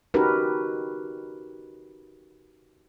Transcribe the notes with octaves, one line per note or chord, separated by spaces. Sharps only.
C#4 D#4 F#4 G4 A#4 B4